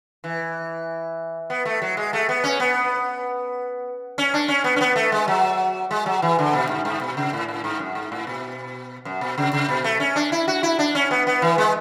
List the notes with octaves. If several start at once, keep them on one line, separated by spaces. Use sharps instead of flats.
E3
B3
A3
F#3
G#3
A3
B3
C#4
B3
C#4
D4
C#4
B3
C#4
B3
A3
G#3
F#3
G#3
F#3
E3
D3
B2
G#2
G#2
B2
C#3
A2
A2
G#2
F#2
G#2
A2
B2
F#2
B2
C#3
C#3
B2
A3
C#4
D4
E4
F#4
E4
D4
C#4
B3
B3
E3
G#3